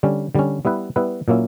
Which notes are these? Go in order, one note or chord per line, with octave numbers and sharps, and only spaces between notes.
D3 G3 C#4
D3 G3 C#4
G3 B3 E4 B4
G3 B3 E4 B4
A#2 F#3 A#3 C#4 E4